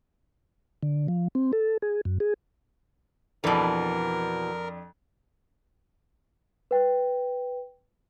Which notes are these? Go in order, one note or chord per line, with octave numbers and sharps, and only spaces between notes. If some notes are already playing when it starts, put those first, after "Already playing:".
D3
F3
C4
A4
G#4
F#2
G#4
F2 B2 E3 D4 A4 A#4
B4 G5